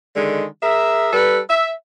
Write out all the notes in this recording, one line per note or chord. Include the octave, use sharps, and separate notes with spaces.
D3 D#3 G#3
G#4 A#4 E5
G3 A4 B4
E5